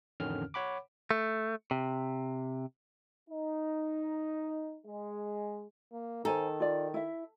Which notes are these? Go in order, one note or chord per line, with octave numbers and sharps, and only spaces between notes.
A1 F2 D3 D#3 C#4 F6
C#5 F#5 B5 D6
A3
C3
D#4
G#3
A#3
D#3 A4 C5 G#5 A#5
F4 D5
E4 E5